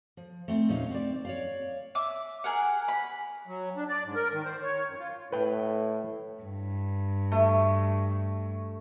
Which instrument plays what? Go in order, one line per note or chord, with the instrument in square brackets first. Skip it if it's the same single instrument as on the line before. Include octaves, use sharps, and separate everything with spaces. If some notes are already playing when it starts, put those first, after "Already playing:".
[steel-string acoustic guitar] F3
A3 C4
E2 A#2 C#4 D#4 F5
C4 D5
C#5 D5 F5
[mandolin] E5 D6
G#4 A#4 F#5
B5
[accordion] F#3
D4
D5
G#2
A#4
D#3
C5
C#5
F#2
F4
[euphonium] A2 [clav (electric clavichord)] B4 G5
[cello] G2
[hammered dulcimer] A3